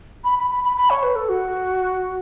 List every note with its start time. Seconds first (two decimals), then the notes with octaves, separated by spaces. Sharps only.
0.24 B5
0.38 B5
0.50 B5
0.64 B5
0.77 B5
0.90 C#5
1.03 B4
1.16 A4
1.29 F#4